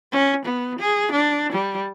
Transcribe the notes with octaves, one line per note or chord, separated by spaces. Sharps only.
C#4
B3
G#4
D4
G3